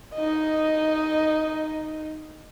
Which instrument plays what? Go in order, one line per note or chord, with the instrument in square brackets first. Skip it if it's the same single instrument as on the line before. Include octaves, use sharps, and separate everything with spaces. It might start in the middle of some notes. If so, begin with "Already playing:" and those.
[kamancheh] D#4 D#5